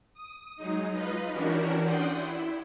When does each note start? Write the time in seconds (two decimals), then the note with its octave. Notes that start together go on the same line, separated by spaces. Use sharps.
0.14 D#6
0.56 F#3 G#3 D#4
0.92 D#4 F4 B4 D#5
1.30 E3 C#4 D4 F#4 G4 A#4
1.82 D5 F#5 G5 C6 D#6
2.11 E4